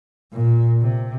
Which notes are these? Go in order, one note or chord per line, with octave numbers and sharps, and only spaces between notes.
A#2
C3